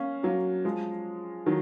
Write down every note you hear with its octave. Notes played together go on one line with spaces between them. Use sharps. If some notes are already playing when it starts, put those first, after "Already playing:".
Already playing: A#3 C#4
F#3 A#3
F3 G#3
D#3 F#3